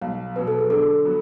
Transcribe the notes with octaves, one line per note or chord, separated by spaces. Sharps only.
B1 F5
B2 F#3 B4
A4
G#4
D3 A4
F#3 B3